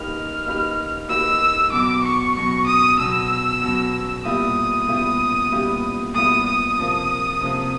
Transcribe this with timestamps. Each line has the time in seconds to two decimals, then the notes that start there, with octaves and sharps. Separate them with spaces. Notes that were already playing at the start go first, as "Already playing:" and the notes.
Already playing: A#3 D#4 G4 B4 F6
0.46 A#3 D#4 G4 B4
1.08 A#3 D#4 G4 B4 E6
1.72 B2 F#3 B3 D6
2.04 C#6
2.35 B2 F#3 B3 C#6
2.67 D#6
2.98 B2 F#3 B3 E6
3.61 B2 F#3 B3
4.25 A#2 G3 B3 E4 G4 D#6
4.88 A#2 G3 B3 E4 G4
5.52 A#2 G3 B3 E4 G4
6.14 A#2 G3 B3 E4 G4 D#6
6.46 D#6
6.78 C3 F3 A#3
7.41 C3 F3 A#3